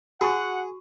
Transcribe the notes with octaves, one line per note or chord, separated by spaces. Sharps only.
F#4 G#4 F#5 C#6